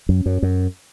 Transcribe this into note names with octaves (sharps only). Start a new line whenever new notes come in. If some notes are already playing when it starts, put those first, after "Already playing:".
F#2
F#2
F#2